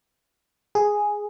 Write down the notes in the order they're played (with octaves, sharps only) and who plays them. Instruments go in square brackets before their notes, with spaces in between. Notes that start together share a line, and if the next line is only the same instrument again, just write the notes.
[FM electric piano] G#4